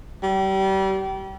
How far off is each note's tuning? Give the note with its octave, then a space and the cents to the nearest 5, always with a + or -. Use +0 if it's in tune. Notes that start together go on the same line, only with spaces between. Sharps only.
G3 -30